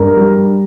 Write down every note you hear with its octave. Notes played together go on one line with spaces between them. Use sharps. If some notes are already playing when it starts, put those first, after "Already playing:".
Already playing: G2 A#4 A#5
G3